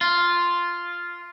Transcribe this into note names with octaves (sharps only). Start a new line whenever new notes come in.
F4